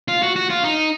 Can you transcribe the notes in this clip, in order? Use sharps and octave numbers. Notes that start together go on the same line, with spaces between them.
F4
F#4
F#4
F4
D#4